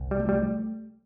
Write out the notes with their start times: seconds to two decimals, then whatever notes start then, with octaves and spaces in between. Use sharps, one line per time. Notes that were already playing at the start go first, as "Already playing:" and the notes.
Already playing: C2
0.11 G3
0.19 A3
0.29 G3